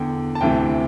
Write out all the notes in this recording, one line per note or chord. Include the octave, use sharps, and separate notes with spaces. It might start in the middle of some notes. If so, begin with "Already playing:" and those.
Already playing: E2 D3 G5
A5
D2 C3 E3 G5